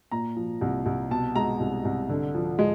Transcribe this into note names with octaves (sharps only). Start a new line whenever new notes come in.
A#2 A#5
F3
C2
C2
B2 A5
G#3 A#5
C2
C2
D3
F3
G#3